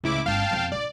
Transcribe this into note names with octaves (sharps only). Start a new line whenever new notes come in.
C#2 A2 E4 D6
G1 C#4 F5 G5 A5
F2 B2
A1 D5